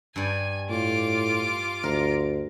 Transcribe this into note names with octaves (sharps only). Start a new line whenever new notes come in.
G2 D5 G#5
A2 F4 D6
D2 A#4